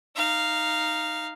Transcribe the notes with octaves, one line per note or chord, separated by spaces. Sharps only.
D#4 F5